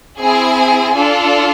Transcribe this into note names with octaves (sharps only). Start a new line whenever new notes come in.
C4 E4 G#4 G#5
D4 F4 A4